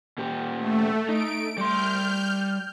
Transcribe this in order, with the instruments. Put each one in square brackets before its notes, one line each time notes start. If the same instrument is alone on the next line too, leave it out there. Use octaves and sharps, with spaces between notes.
[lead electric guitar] A#2 G4
[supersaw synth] A3
[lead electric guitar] D#4 [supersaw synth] D7
[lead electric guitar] G3 C6 [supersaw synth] F6 G6